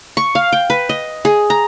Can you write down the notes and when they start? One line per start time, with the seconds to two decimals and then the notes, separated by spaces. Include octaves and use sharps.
0.17 C#6
0.35 F5
0.53 G5
0.70 B4
0.89 D#5
1.25 G#4
1.50 A#5